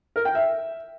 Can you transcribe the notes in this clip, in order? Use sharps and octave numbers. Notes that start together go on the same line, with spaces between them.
A#4
G5
E5